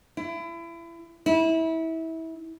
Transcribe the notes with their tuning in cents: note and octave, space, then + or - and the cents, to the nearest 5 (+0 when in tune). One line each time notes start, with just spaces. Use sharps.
E4 +30
E4 -25